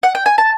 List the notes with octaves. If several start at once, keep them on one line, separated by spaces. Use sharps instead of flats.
F#5
G5
G#5
A5